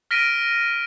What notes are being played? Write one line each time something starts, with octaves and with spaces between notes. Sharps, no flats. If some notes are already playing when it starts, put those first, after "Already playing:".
F6 A#6 B6 D7 D#7